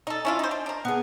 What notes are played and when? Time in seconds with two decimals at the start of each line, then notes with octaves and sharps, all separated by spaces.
0.07 D#4 A4 D#5
0.25 C#4 E4 F4
0.39 D#4 C5
0.51 D4
0.66 D4 A#4
0.85 B3 G#4